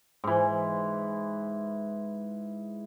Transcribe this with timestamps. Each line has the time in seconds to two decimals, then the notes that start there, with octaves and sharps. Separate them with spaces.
0.24 G#2 E3